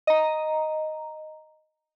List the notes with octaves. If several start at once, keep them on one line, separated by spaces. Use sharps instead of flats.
D#5 A#5